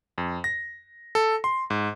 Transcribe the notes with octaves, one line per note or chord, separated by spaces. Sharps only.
F2
A#6
A4
C6
G#2